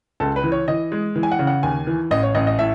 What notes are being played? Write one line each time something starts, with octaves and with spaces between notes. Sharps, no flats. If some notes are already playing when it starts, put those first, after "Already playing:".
C#2 A4
B4
E3
C#5
E3 D#5
G#3
E3
G#5
F#5
C#3
F#5
D#2 G#5
E3
A1 D#5
C#5
A1 D#5
D#5
A2 E5